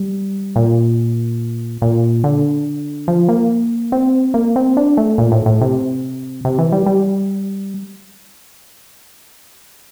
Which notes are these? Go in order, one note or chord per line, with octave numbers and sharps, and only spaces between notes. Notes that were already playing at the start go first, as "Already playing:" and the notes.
Already playing: G3
A#2
A#2
D3
F3
A#3
C4
A#3
C4
D4
A3
A#2
A2
A2
C3
C3
E3
G3
G3